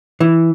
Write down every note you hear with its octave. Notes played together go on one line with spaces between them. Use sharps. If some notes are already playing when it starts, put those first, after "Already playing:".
E3